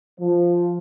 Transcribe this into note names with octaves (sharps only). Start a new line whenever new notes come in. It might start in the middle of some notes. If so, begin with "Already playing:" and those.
F3